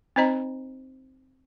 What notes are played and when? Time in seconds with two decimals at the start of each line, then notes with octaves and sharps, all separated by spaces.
0.16 C4 D#4 C5 D#5 A#5